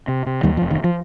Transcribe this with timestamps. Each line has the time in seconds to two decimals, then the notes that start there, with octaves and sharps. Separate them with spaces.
0.08 C3
0.26 C3
0.43 D#2 D#3 G3
0.57 F3
0.62 F1
0.71 D#3
0.84 F3